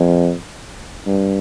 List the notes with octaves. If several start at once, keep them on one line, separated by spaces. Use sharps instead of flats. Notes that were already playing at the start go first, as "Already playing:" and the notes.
Already playing: F2
G2